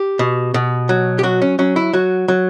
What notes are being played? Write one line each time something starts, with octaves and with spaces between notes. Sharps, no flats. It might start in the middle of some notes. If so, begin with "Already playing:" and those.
Already playing: G4
B2
B2
F#3
G4
F#3 F#4
C#4
F#3 C#4
E4
F#3 F#4
F#3